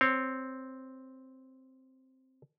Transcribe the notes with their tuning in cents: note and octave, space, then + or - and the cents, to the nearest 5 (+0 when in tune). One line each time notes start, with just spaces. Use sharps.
C4 +0 C#5 -5